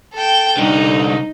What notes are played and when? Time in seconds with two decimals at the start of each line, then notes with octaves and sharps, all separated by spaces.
0.14 A4 G5
0.58 C2 D3 D#4